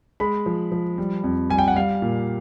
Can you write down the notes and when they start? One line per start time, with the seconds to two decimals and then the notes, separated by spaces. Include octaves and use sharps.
0.20 G#3 B5
0.46 F3
0.72 F3
0.98 G3
1.24 F2
1.50 G3 G#5
1.58 G5
1.68 F#5
1.76 G3 F5
2.02 A#2